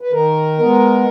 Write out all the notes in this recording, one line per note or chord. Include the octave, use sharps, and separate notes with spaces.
B4
D#3 A#4
G#3 B3